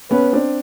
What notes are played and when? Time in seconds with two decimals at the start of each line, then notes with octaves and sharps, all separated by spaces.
0.11 B3 C#4 B4
0.33 C4 D4